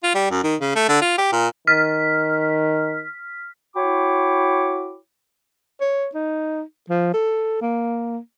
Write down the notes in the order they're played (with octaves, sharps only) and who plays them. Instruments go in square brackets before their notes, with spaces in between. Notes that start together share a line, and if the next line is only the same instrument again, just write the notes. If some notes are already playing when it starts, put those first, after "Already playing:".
[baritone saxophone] F4
G3
F#2
D#3
C#3
A3
D3
F4
G4
A#2
[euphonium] D#3 [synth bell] F6 B6
[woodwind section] E4 F#4 C#5 G5 B5 D6
[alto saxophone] C#5
D#4
F3
A4
A#3